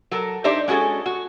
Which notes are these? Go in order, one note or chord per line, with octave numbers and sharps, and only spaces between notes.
F#3 A4 A#4
D4 D#4 G4 C5 D#5 E5
G#3 C#4 F#4 G#4 A4
F#4